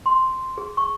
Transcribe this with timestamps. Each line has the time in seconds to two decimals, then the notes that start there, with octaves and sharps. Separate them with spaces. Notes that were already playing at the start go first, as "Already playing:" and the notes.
0.06 C6
0.58 G#4
0.77 C#6